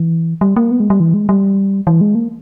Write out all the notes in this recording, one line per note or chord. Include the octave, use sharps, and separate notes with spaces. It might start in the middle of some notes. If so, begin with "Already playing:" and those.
Already playing: E3
G3
A#3
B3
G#3
G3
E3
G#3
G3
E3
G#3
A#3